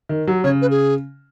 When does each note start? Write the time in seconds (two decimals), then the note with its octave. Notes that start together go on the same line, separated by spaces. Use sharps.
0.09 D#3
0.28 F#3
0.44 C#3 C#5
0.62 B4
0.71 G#4